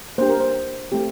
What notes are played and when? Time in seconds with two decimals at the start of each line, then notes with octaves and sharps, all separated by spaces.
0.18 A#3 D4 G4 C5
0.29 A#4
0.40 C5
0.92 A3 C4 G4